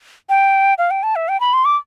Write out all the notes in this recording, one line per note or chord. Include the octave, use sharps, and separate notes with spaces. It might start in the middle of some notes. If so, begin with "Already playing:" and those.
G5
F5
G5
A5
E5
G5
B5
C6
D6